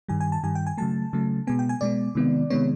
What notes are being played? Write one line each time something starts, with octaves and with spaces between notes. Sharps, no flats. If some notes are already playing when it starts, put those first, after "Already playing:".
G2 D#3 G3 G#5
G#5
A5
G2 D#3 G3 G#5
G5
G#5
C#3 F#3 A3 A5
C#3 F#3 A3
B2 G#3 B3 G#5
G5
G#5
B2 G#3 B3 D5
C3 D#3 G#3 B3
C3 D#3 G#3 B3 C#5